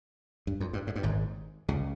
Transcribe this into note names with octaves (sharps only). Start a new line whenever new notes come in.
G2
F2
G2
G#2
G2
G#1 G#2
C#2 C#3